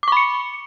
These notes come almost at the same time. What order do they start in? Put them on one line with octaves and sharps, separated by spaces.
D6 C#6 B5 C#7